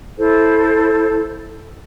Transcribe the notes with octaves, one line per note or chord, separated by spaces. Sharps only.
E4 A4 C5